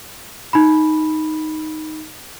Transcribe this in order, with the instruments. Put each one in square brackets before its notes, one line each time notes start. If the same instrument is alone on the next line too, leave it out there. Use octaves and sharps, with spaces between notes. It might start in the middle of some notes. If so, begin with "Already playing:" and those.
[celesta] D#4 B5